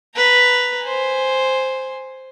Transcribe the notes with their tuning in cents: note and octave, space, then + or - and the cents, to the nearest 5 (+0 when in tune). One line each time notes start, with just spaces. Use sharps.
B4 +0 A#5 +0
C5 +0 G#5 +0